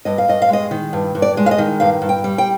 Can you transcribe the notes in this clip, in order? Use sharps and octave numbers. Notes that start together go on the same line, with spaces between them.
G2 D#5
F5
G2 D#5
F5
G#3 D#5
D#3
G2
G2
D5
G#3
F5
D#5
D#3
G2 F5
G2
G5
G3
G5